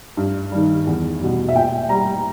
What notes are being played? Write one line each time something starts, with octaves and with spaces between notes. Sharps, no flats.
G2
D#3 G3
E2
B2 G3
E5
A#2 G5
G3 A#5